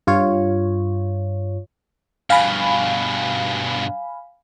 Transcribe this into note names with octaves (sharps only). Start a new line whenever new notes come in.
G2 F4 C#5
G2 B2 F5 G#5 B5